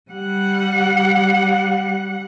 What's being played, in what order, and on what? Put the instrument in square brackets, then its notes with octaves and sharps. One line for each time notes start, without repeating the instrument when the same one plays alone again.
[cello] G3 F#5